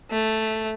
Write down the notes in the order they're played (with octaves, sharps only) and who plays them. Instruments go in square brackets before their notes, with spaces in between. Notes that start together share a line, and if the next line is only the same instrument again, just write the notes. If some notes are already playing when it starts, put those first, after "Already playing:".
[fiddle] A3